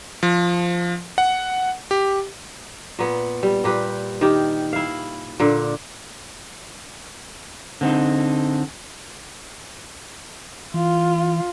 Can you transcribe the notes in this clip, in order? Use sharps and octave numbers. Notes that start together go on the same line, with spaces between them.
F3
F#5
G4
A#2 B3
G3
A#2 G4 B4
D#3 G4
E4 F5
A#2 D3
D3 C4 D#4
E3 F4